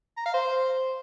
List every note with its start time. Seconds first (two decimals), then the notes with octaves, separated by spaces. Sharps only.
0.17 A#5
0.25 F5
0.34 C5